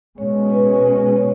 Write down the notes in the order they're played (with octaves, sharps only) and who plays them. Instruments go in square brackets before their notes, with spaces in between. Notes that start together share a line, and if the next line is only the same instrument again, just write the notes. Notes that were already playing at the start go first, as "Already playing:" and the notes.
[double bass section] B2 G#3 C#4 [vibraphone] C#5
[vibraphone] B4
C#5